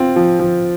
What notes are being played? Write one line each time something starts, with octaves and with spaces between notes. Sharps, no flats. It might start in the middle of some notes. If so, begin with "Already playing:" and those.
Already playing: C4 F4
F3
F3